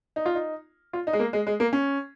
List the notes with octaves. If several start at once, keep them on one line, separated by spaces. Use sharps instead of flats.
D#4
F4
D#4
F4
D#4
G#3
A#3
G#3
G#3
A#3
C#4